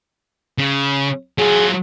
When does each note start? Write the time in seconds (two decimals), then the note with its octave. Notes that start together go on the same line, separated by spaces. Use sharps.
0.58 C#3
1.38 F#3 F4 G#4